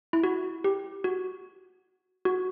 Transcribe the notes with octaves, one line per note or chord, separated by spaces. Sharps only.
E4
F#4
G4
F#4
F#4